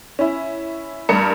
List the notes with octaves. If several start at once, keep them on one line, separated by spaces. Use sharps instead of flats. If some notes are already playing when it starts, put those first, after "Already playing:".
C#4 E4
A1 G2 A#4 C#7